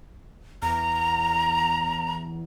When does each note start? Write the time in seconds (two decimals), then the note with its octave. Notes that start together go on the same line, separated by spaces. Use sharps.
0.62 E2 A#5